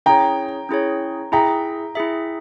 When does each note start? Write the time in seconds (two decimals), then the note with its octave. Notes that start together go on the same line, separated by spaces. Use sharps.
0.06 C#4 E4 G#4 C#5 G5 A#5
0.69 C#4 E4 G#4 C#5
1.32 E4 G#4 E5 G5 A#5
1.95 E4 G#4 E5